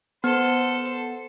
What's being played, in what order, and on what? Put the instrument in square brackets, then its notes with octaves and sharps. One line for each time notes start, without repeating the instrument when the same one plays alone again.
[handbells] B3 [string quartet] A4 C5